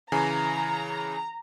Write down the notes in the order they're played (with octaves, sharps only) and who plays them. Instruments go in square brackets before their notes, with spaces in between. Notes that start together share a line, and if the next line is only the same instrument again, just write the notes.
[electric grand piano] C#3 E3 G#5 [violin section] A#5